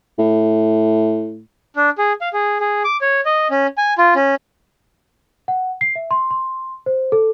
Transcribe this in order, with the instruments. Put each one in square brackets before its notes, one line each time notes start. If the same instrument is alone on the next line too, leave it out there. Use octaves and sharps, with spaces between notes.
[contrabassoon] A2
[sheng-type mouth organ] D4
G#4
F5
G#4
G#4
D6
C#5
D#5
C#4
G#5
F4
C#4
[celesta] F#5
C7
E5
C6
C6
C5
A4